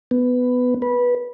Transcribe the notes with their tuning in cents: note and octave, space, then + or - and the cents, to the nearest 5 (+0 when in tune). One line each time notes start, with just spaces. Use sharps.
B3 +10
B4 -15